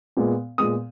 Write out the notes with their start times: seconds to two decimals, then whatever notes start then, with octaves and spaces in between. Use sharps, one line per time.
0.17 A#2 G#3 B3
0.58 A#2 G#3 B3 D#6